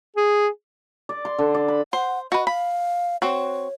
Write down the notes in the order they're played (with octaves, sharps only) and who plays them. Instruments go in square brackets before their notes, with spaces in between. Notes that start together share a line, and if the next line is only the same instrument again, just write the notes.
[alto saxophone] G#4
[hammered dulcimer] D5
C6
D3
D5
B5
[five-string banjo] C5 [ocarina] F#5
[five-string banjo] F#4 B4 [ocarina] D#5
[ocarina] F5 [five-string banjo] B5
[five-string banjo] C4 F#4 [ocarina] C#5